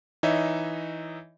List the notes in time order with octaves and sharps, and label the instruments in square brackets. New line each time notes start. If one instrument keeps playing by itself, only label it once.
[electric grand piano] E3 D#4 C#5 D#5 E5